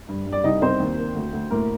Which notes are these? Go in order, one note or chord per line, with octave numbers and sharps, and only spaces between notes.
G2
G2
D5
C2 D#4 D#5
C2 C4 C5
D#2
A#3
D2
D2
A2 A#3 A#4